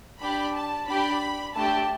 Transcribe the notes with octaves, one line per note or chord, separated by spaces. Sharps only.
D4 G4 B5
A5
D4 G4 B5
A3 D4 G4 A5